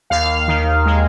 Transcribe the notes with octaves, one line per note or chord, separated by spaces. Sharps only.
D#2 F5
D#3
G#3